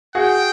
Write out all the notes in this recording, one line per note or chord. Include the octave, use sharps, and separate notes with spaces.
F#4 G#4 G5